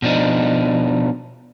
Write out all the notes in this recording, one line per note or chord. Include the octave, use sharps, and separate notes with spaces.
B2 F3 D4 D#4